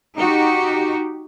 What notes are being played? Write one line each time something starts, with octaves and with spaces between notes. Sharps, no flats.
D#4 F#4 G4